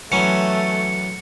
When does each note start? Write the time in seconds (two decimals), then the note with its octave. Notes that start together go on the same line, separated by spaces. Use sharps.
0.12 E3 F#3 A3 C#4 C#7